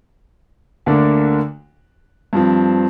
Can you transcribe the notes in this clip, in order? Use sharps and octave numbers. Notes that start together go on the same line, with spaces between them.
D2 D3 A#3 D4
G2 F3 C4